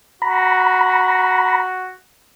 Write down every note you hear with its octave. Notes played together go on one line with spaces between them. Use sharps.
F#4 A#5 B5